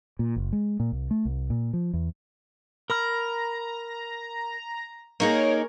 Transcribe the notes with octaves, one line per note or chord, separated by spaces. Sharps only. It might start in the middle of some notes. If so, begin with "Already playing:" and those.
A#2
F#1
G#3
A#2
C2
A3
C2
A#2
F3
E2
A#4 A#5 B5 F6
A#3 D#4 G#4 A#4 C#5